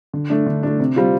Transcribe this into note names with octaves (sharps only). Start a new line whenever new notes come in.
D3
A3 D4
D3
A3 D4
C3
G3 C4 F4